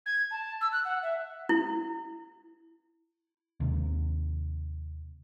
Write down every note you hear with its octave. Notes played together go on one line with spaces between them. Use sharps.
G#6
A5
E6
F#6
F#5
E5
E4
D#2 C3